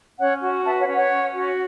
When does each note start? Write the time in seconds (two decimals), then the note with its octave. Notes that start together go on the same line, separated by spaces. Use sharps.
0.19 C#4 C#5 F#5
0.42 F#4
0.65 B4 E5 A5
0.80 C#5 F#5
0.87 C#4
0.94 C#5 F#5
1.11 C#4
1.33 F#4